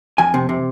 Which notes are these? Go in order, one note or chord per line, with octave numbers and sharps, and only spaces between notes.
F2 G#5
C3
C3